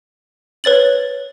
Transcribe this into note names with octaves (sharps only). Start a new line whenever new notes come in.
B4 C#5 A6 F#7